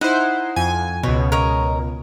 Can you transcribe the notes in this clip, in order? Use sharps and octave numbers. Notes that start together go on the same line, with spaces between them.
D#4 E4 C5 F#5
F2 G#5
C#2 B2 C#5
A#4 C#5 D#5